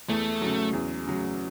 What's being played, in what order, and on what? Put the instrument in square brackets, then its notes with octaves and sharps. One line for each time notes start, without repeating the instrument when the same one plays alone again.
[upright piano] E2 [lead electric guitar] A3
[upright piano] C#3 F#3
E2
C#3 F#3